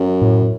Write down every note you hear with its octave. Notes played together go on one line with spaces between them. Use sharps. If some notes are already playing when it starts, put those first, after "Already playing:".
Already playing: F#2
A2